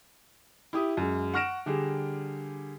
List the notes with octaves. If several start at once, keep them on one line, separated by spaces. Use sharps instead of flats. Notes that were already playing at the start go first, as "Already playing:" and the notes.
E4 G4 D#6
F#2 G#3
F#5 C#6 F6 A#6 D7 E7
D3 G3 G4 G#4